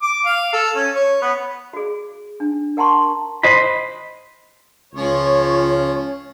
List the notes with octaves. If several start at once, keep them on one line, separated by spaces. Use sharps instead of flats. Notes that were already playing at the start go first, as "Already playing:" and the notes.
D6
F5
A4
C#4
C#5
B3
F#4 G#4
D4
A#4 F#5 A5 A#5 C6 C#6
C5 D#5 B5
C#2 F3 C#4 C#5